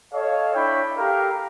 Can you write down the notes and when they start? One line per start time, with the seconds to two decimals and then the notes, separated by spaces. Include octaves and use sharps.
0.12 A4 C#5 D#5 F5
0.54 D4 E4 C#5 G5 B5
0.97 G4 A4 A#4 F5